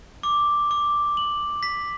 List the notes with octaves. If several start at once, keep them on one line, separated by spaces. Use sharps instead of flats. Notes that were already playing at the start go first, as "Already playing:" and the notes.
D6
D6
F#7
B6